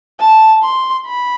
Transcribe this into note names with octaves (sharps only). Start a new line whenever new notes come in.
A5
C6
B5